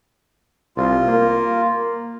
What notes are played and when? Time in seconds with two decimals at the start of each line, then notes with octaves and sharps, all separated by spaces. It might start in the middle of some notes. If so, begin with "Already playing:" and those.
0.77 C2 F4
1.08 A#3